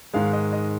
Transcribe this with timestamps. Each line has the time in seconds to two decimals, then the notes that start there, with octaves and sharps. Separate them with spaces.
0.14 G#2 D#3 G#3 F5
0.33 D#5
0.53 D#5